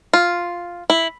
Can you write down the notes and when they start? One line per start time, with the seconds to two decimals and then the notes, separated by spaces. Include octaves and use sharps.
0.13 F4
0.90 E4